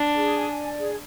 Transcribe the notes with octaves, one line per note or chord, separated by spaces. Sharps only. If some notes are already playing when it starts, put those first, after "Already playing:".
Already playing: D4
G#4
G#5
D5
G#4